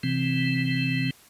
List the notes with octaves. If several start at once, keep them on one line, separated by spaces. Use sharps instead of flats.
C3 E3 C4